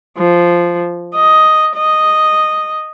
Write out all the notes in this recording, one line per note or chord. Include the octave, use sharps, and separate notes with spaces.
F3
D#5
D#5